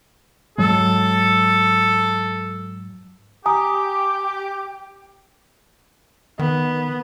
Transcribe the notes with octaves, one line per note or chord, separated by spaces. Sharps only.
G#2 F#3 G#3 A4
G4 G#5 A#5 D#6
D#3 B3